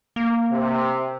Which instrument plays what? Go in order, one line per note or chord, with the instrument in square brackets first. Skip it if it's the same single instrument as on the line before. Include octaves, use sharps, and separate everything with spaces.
[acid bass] A#3
[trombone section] C3